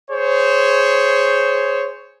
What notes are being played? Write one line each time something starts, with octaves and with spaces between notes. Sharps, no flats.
G#4 C5 C#5